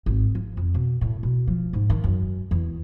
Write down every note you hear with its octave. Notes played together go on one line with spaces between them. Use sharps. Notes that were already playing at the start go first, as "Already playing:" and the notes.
G#1
F3
F2
B2
A2
B2
F3
G#2
D#3
F#2
E2